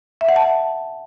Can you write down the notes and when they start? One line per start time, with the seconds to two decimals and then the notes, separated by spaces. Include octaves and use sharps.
0.21 E5
0.29 F#5
0.36 A5